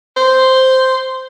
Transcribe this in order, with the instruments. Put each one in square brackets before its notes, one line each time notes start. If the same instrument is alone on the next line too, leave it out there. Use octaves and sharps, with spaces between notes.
[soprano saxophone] C5